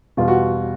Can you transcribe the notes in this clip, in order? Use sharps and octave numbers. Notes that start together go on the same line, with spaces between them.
E2 B2 G3 F4
F#4